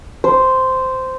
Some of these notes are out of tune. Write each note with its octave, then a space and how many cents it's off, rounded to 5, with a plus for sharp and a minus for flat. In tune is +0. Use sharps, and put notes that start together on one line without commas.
C5 -10